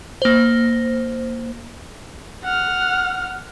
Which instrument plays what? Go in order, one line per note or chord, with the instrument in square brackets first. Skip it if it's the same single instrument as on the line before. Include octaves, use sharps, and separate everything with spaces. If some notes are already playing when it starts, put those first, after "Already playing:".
[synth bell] A#3 C5
[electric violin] F#5 F6